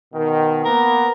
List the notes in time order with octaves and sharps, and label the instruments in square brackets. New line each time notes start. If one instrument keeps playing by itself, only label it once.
[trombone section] B2 D#3
[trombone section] A#3 B3 [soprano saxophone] A#4